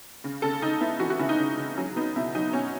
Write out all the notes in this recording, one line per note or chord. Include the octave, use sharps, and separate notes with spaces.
C#3
C#3 A4
C#3 D#4
B3 E4
E3 F#4
F#4
C#3 E4
D#4
C#3
C#3
F#3 C#4
B3 D#4
B2 E4
F#3 D#4
B2 C#4